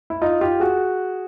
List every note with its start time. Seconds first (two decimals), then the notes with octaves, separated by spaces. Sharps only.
0.10 E4
0.22 D#4 F4
0.41 F4 G4
0.60 F#4 G#4